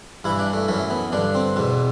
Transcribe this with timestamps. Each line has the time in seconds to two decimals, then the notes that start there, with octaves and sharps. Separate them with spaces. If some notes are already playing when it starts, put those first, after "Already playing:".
0.24 G2 E3 E4
0.39 D4
0.53 A3
0.68 F#2 E3 A3
0.90 B3
1.12 G2 D3 D4
1.35 C4
1.56 E2 B2